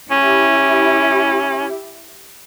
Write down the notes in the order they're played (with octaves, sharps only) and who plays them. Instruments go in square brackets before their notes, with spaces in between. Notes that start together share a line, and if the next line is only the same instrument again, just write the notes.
[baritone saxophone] C#4 [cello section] E4 G4